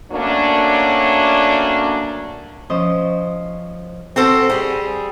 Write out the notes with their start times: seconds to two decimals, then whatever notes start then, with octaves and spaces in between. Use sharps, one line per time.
0.12 F#3 A3 A#3 C#4 D4
2.70 F3 C#4 C5 D#5
4.16 C4 F#4 A4 C5
4.50 G3 G#4